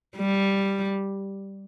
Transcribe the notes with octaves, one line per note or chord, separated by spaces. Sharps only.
G3